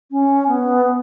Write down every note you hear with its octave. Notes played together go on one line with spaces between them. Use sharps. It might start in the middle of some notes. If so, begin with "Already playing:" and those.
C#4
B3